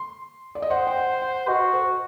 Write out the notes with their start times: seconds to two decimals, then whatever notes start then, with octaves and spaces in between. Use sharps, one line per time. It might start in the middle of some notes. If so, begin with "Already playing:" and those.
Already playing: C6
0.55 D5
0.62 D#5
0.70 C5 F#5
0.87 G5
0.97 F#5
1.22 F#5
1.48 F#4 D#5
1.74 C5